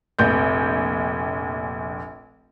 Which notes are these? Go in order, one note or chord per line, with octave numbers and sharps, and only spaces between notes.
F1 A#1 G6